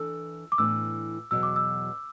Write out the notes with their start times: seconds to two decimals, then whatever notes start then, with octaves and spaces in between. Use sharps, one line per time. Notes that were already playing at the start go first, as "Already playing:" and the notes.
Already playing: E3 D4 A4 E6
0.52 D6
0.58 A2 E3 B3 D4 E6
1.31 E2 B2 F#3 E6
1.43 D6
1.56 E6